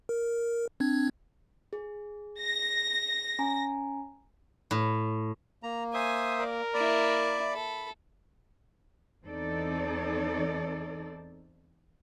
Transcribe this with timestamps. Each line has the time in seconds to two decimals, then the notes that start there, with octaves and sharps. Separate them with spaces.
0.09 A#4
0.80 C4 D4 G#6
1.73 G#4
2.40 A#6
3.39 C#4 G#5 A#5
4.71 A2
5.63 A#3 A#5
5.94 C5 E5 G#5 D#6
6.40 A#4 D5
6.74 A#3 E4 D5 B5
7.52 A4
9.26 E2 E3 C4 D#4 A4 D5